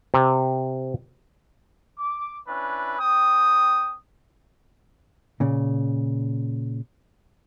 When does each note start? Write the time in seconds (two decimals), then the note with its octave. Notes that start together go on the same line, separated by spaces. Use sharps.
0.14 C3
1.99 D6
2.48 C#4 D4 E4 B4
2.99 C4 G5 D#6
5.40 A#2 C#3